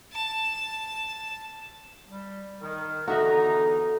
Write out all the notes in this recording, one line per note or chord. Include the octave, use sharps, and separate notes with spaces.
A5
G3
D#3 A#4
E2 D3 D#4 F#4 A4 E5 F#5 A#5